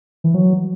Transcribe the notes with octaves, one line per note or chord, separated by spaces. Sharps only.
E3
F#3